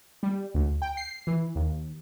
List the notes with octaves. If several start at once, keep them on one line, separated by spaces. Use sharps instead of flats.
G3
D2
G5
C7
E3
D#2